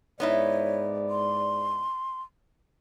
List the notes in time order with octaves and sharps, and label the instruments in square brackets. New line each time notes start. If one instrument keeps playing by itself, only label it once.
[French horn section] G#2 D5 [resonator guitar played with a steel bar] B3 D#4 E4 [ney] C#5
[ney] C6